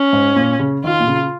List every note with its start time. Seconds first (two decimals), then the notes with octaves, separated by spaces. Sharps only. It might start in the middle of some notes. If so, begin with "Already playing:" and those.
Already playing: C#4
0.13 G#2
0.36 A#2
0.60 C#3
0.84 D#3 F4
1.00 A#2
1.07 C#3